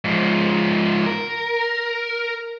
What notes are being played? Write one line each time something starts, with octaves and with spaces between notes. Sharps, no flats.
G#2 F3
A#4